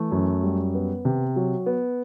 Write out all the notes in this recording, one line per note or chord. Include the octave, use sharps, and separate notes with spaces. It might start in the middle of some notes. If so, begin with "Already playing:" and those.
Already playing: E3 A3
F#2
G3
B3
C3
F#3
B3